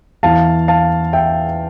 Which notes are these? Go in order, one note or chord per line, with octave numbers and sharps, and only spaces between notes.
E2 E3 F5 A5
F5 A5
E5 G5